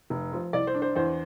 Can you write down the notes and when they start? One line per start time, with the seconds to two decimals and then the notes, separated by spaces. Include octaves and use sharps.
0.10 F1
0.33 F3
0.53 C2 D5
0.67 C5
0.74 D4
0.82 C5
0.96 E2 C5